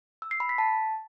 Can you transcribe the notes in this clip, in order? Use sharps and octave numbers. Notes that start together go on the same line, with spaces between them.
E6
C7
B5
B6
A5